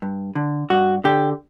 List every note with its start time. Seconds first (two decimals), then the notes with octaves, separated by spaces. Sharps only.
0.02 G2
0.35 D3
0.70 G2 F#4
1.04 D3 G4